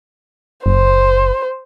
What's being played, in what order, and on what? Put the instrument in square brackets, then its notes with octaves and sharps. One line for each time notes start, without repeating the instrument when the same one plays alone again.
[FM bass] F#1 [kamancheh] C5